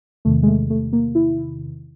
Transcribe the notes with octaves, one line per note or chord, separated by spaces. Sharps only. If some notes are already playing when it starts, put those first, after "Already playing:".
E2 C3 D#3 A3
G#3
A3
A3
A#3
E4